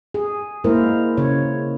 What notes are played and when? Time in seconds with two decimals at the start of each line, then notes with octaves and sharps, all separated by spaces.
0.14 G#4
0.64 G#3 A#3 E4 A#4 C5
1.17 C#3 C#5